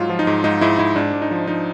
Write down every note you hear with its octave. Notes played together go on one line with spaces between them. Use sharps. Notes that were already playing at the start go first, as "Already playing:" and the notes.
Already playing: G#2 F#3 F4
F3
D#4
G#2
G#2 D#4
G#2 E4
G#2 E4
G#2 D4
G#2
D#4
F3
F3 D#4